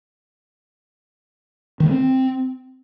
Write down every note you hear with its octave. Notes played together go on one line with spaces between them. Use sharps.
D#3
A3
C4